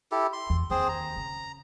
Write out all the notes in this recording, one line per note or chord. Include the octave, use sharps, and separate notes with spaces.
E4 G4 A4
C6
E2
D#2 C4 G#4 C5
A#5
C#3